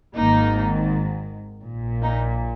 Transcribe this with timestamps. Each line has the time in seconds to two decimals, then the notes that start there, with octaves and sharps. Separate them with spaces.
0.16 G#1 G#2 D#3 A#3 D#4
1.65 A#2
1.70 A#1
2.02 A#3 D#4